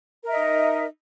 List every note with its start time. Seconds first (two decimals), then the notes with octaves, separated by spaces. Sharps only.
0.23 A#4
0.27 E5
0.31 D#5
0.35 D#4